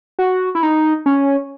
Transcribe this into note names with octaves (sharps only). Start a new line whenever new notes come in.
F#4
E4
D#4
C#4